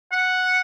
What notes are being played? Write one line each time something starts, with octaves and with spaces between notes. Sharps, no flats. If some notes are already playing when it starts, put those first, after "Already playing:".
F#5